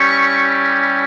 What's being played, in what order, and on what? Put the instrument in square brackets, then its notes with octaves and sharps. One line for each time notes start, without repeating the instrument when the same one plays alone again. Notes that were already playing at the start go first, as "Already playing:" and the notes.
Already playing: [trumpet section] G3 C#4 E4 G4 C#6